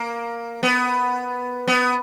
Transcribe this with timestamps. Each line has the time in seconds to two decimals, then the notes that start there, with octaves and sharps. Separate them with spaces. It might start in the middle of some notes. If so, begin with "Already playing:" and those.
Already playing: A#3
0.63 B3
1.67 B3